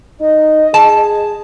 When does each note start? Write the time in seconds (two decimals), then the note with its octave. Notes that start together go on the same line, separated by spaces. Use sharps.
0.21 D#4 D#5
0.74 G#4 A5